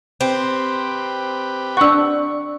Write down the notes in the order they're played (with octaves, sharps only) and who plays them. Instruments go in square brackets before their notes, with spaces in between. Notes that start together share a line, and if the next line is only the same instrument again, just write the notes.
[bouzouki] C4 [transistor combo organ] G4 B4
[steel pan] D4 F#5 [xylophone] C#6 E6